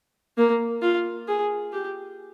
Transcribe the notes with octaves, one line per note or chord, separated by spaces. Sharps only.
A#3
F4
G#4
G4